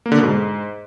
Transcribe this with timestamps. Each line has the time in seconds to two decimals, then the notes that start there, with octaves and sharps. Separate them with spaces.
0.06 A#3
0.12 D3
0.18 B2
0.24 G#2